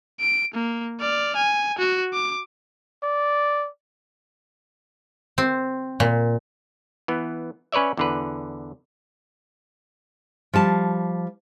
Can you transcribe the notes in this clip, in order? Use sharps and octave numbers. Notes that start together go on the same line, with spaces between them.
D7
A#3
D5 F6
G#5
F#4
D6
D5
C4
A#2
E3 B3
C#4 B4 C#5 D5 E5
E2 D3 B4
F3 G3 A5